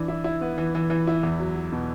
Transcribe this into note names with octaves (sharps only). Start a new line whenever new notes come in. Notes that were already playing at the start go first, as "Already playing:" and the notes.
Already playing: E3 D4
E4
E4
B3
E3
E3
E3
E4
E2
F#3
F#3
B2